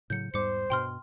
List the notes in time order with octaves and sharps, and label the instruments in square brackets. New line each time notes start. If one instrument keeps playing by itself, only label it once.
[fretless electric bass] A2 C#3 F#3 [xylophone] G6 C#7
[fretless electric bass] E2 G#2 G3 [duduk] C5 [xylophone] D6 C#7
[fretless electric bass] G2 B2 [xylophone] G5 C6 F6